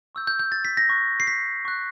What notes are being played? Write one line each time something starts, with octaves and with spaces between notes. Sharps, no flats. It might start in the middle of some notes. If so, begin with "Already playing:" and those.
C#6 E6 G6
G6
G6
A6
B6
A#6
C#6 F#6
C7
B6
C#6 F#6